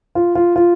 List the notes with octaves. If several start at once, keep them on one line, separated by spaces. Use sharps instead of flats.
F4
F4
F4